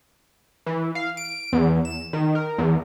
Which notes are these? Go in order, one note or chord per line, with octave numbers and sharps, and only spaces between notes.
E3
F5
D7
E2
E7
D#3
A#4
E2